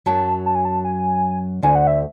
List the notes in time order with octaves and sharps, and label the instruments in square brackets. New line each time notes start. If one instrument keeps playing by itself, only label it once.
[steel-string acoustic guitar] F#2 F#3 [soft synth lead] A5
[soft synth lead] A5
G#5
A5
G#5
[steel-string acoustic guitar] D2 D3 [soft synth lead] G#5
[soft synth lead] F#5
E5